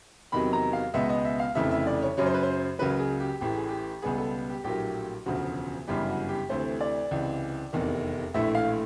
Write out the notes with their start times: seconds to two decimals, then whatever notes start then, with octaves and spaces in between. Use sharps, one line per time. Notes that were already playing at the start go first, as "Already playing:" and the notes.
0.32 E2 C3 D#3 F#3 B5
0.53 A#5
0.73 F5
0.94 C#2 B2 G#3 B3 E5
1.09 D#5
1.25 E5
1.40 F5
1.55 F1 F2 C#3 E3 A3 E5
1.71 E5
1.86 D5
2.02 C#5
2.17 F#2 C#3 F#3 C#5
2.26 C5
2.34 B4
2.43 C5
2.79 C#2 C#3 F#3 A#3 B4
2.99 G#4
3.20 G4
3.41 A1 A2 E3 G4
3.55 G#4
3.69 G4
4.02 C#2 B2 G3 B3 G#4
4.18 A4
4.49 G4
4.64 A#1 A2 F#3 A#3 G4
5.26 E1 D2 C#3 F3 F#4
5.87 G1 F#2 C#3 E3 G3 G4
6.08 F#4
6.29 G4
6.49 D2 C3 E3 A3 C5
6.81 D5
7.11 C#2 C3 E3
7.73 F1 E2 C3 D#3
8.34 A#1 A2 E3 A3 E5
8.55 F5